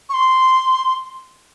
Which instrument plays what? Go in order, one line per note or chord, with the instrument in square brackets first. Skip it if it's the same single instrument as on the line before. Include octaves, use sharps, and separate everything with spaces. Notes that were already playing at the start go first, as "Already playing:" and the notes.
[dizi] C#6
C6